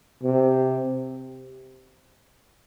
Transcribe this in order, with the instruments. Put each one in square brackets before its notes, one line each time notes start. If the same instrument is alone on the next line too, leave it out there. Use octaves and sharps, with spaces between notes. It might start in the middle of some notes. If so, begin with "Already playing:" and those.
[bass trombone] C3